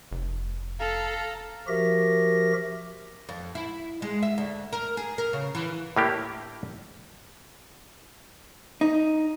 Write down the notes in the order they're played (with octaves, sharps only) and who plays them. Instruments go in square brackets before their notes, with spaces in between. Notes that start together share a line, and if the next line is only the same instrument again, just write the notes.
[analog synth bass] F1
[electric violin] A4 [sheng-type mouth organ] F5 A#5
[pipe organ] F3 F#4 G4 A#4 E5 A#6
[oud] F2
E4
G#3
E5
D2
A#4
G#4
A#4
C#3
E3
[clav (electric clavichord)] A2 A3 A#3 D4 G4
[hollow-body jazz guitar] D#4